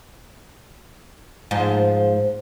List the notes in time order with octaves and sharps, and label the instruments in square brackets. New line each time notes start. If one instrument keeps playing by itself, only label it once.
[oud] G#2 F3